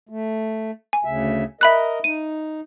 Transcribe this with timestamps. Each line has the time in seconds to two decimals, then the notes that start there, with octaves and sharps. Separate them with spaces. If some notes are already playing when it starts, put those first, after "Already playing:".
0.09 A3
0.93 G#5
1.05 D2 C#3 E5
1.61 A#4 D#5 E5 B5 F#6
2.04 D#4 D#7